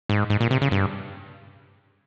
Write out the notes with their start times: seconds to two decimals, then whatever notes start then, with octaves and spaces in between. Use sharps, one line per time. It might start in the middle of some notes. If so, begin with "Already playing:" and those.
0.09 G#2
0.30 G#2
0.40 A#2
0.51 C3
0.61 C#3
0.71 G2